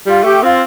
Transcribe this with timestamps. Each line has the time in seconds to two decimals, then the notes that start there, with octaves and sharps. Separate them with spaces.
0.06 G3 F4
0.24 A3 G4
0.43 C4 F4